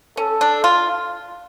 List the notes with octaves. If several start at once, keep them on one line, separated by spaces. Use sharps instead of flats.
C#4 A4
D4
F4